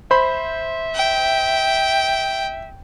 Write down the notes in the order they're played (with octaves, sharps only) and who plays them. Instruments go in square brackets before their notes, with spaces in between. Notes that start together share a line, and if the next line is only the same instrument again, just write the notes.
[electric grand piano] C5 B5 [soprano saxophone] E5
[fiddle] G5